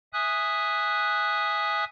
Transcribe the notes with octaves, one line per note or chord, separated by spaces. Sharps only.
E5 G#5 D#6 F#6